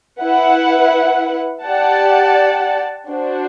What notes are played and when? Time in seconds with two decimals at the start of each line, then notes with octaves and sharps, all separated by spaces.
0.22 E4 B4 F#5
1.65 G4 D5 F#5 A5
3.09 D4 F#4 C5